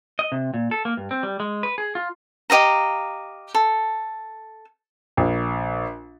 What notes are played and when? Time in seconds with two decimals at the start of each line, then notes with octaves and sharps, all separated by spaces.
0.19 D#5
0.32 C3
0.54 A#2
0.71 A4
0.85 A#3
0.97 G2
1.11 C4
1.23 G3
1.40 G#3
1.63 B4
1.78 G#4
1.95 F4
2.50 G4 D#5 F5 A#5
3.54 A4
5.17 A#1